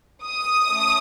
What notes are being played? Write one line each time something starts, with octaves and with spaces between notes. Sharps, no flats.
D#6
A3 C#4